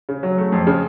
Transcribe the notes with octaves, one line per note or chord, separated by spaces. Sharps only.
C#3
F#3
A3
F2
C#3